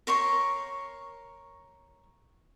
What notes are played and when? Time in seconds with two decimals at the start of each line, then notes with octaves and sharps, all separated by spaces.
0.07 A#4 C#5 C6 C#6